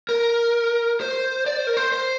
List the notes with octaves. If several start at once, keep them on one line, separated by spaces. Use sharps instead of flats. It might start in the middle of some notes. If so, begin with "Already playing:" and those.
A#4
C5
D5
C5
A#4
C5
C5